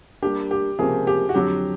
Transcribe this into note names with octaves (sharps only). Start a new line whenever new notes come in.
G3 A#3 D4 G4
G4
C#2 C3 F3 A#3 G#4
G4
F#4
F2 D3 F#3 G4